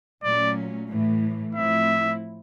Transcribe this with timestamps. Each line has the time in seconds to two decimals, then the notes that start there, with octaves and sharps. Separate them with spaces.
0.23 A#2 F#3 A3 C#4 D5
0.89 A2 E3 A3
1.54 A2 F3 A3 C4 E4 E5